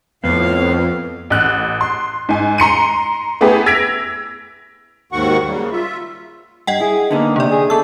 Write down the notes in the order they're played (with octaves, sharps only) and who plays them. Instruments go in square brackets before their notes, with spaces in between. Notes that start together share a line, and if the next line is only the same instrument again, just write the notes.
[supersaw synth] F2 [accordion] A2 F5 [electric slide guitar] B3
[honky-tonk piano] A1 F#6
C6
G#2 G#5
A#5 C6 C#7 D#7
A3 B3 E4 G4 G#4
E6 G#6 A#6 B6 D7 F7
[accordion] D#2 G#2 D#3 F#4 F#5 C#6
C#3 G3 A#3
F4 E5
[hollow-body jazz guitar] G2 [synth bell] D#5 F#5 G5
[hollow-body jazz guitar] E4 [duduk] G#4
[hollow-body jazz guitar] D3 B3 D#4 [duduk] A#3
[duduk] C3 [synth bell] A#3 D5
[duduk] G#4
[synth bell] B3 E6 [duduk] A4